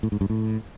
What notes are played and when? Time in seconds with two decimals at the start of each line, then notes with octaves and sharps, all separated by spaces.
0.03 A2
0.12 G#2
0.21 G2
0.30 A2